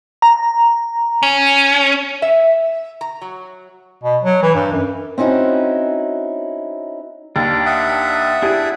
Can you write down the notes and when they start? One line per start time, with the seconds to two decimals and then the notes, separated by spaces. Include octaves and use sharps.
0.22 A#5
1.23 C#4
2.22 E5
3.01 A#5
3.22 F#3
4.04 B2
4.24 F#3
4.42 E3
4.54 G2
4.72 F#2
5.18 C4 C#4 D#4 E4 F#4
7.36 D#2 D4
7.66 E5 F#5 D#6
8.42 D4 E4 G4 G#4